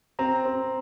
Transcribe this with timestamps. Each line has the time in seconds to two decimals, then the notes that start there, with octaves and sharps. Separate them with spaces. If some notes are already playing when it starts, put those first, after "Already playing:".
0.19 C4 A#5
0.46 C4